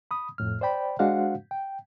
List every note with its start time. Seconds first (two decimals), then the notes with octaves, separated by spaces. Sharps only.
0.11 B5 D#6
0.38 F2 A2 F6
0.61 C5 D5 G5 B5
0.99 G#3 D4 F#4 C5 F5 F#5
1.51 G5